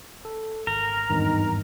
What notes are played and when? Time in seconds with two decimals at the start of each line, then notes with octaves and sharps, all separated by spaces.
0.25 A4
0.67 G#1 A#4
1.10 G#1 E2 G2 D#3